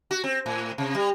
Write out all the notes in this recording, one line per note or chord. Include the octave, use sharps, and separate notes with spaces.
F#4
C4
A2
C3
G3